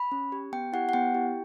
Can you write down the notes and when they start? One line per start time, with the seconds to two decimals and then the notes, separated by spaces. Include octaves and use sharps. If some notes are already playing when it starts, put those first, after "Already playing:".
Already playing: B5
0.12 C#4
0.32 G4
0.53 B3 G5
0.73 E4 G4 F#5
0.89 F#5
0.93 B3 G5
1.14 E4 G4